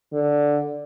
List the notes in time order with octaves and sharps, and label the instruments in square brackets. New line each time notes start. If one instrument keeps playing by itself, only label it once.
[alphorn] D3